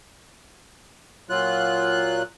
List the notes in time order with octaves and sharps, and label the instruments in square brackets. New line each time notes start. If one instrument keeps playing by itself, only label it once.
[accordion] A#2 F#3 F4 F#6